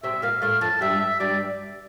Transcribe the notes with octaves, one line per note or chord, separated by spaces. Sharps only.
C3 C4 E5
A#2 A#3 F5
A2 A3 F5
F2 F3 A5
G2 G3 E5
E5
G2 G3 D5